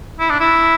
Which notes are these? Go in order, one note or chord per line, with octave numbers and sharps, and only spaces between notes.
E4
D4
E4